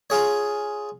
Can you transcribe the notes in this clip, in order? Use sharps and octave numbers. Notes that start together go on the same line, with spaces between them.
F4 G#4 C#5